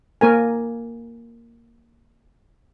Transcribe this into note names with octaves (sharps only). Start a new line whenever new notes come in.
A#3 A#4 G#5